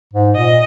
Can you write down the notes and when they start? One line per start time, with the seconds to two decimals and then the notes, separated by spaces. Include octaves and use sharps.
0.13 G#2
0.36 A#2 D#5